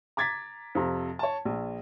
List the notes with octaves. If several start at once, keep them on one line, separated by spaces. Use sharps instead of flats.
A#5 D6 G#6 A6 B6
F2 C3 A#5
C#5 A5
A#1